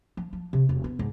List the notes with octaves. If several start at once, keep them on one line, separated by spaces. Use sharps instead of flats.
F3
F3
C3
E1
B3
G#2